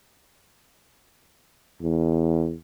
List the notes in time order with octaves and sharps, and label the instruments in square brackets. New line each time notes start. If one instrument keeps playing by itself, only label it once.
[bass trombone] E2